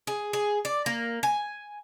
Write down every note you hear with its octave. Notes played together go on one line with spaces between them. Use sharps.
G#4
G#4
D5
A#3
G#5